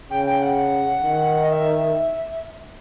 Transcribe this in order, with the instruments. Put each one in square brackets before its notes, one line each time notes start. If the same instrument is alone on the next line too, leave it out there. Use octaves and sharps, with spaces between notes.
[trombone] C#3 [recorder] G5
[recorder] G5
F#5
[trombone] D#3
[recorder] D#5
E5